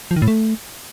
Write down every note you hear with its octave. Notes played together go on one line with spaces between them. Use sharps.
F3
D#3
A2
A3